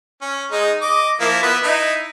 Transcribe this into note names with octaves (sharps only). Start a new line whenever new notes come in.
C#4
G#3 D#4
D#5 D6
F3 A#3 E4
B3 B4 E5
D#4 E4